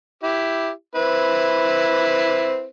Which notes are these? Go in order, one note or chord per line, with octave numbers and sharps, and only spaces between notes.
E4 G4
C4 E4 B4